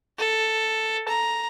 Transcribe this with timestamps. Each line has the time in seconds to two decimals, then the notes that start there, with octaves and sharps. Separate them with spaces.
0.18 A4
1.08 A#5